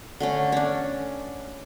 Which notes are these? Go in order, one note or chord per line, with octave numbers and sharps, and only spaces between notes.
D3 A3 C#4
C#4 D4